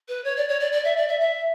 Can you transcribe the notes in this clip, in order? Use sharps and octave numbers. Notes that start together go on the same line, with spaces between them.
B4
C#5
D5
C#5
D5
D5
E5
D5
E5
E5